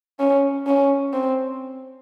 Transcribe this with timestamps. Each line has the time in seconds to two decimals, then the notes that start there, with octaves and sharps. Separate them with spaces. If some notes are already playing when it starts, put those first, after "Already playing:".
0.20 C#4
0.67 C#4
1.13 C4